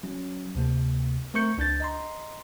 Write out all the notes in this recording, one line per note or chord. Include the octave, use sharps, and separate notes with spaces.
F#3 C#4
D2 C3 A#3
A3 C4 A#4 C#6 G6 C#7
C#2 D4 G6 A6
D#5 A#5 C6